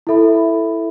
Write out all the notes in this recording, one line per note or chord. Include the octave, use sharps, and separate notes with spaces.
E4 A4 E5 B5